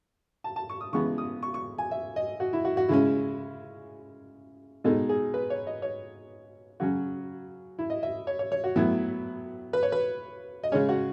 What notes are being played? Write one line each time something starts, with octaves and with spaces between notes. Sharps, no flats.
A5
A5
C#6
D#6
C#3 E3 G#3 B3 C#6
D#6
C#6
C#6
G#5
E5
D#5
F#4
E4
F#4
F#4
C#3 G#3 C#4 E4
B2 G#3 D#4 A4
G#4
B4
C#5
D#5
C#5
C#3 F#3 C#4 F#4
E4
D#5
E5
C#5
C#5
C#5
F#4
A2 F#3 B3 E4
B4
C#5
B4
D#5
C#3 G#3 C#4 C#5
F#4